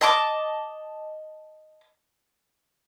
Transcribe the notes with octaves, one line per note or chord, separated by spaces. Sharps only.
D#5 A5 D6